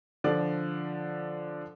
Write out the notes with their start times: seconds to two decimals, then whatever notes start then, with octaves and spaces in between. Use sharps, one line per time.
0.24 D3 F3 D5